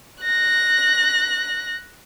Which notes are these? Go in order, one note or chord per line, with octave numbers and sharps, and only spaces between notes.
F#6 A#6